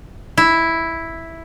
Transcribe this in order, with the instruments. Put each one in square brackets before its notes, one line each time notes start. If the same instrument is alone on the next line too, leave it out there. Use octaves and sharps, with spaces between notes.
[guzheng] E4